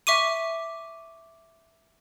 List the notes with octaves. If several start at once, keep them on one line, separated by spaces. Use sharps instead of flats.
E5 C#6 D6 D#7